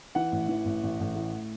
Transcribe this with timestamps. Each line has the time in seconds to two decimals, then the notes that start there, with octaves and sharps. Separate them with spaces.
0.15 E3 F#5
0.32 A1
0.49 E3
0.65 A1
0.83 A1
1.00 A1
1.16 A2